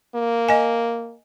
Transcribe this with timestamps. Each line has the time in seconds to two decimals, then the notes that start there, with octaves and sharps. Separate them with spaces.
0.15 A#3
0.49 D#5 G#5